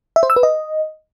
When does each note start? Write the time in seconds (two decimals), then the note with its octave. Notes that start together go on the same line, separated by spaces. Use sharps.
0.16 E5
0.23 C5
0.30 E6
0.36 B4
0.43 D#5